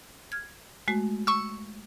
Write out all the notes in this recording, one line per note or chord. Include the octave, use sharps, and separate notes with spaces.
F6 G#6
G#3 A3 F#4
C#6 E6